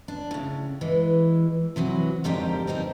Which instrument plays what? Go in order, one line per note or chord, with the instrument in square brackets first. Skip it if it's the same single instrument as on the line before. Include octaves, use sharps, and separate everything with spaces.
[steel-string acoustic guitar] D4
A2 C#3
E3 G#3
C3 E3 F#3 F#4
F2 G#2 D3 G3 G4 A#4
C4 D4 D#4 A#4